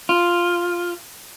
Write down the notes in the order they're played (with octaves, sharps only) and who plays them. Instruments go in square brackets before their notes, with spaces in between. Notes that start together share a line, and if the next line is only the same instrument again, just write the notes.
[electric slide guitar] F4